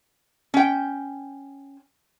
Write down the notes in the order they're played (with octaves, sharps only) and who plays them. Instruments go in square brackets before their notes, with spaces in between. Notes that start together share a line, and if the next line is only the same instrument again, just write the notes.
[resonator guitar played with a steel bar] C#4 G5